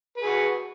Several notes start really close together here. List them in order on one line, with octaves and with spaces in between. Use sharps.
B4 G#4 F#4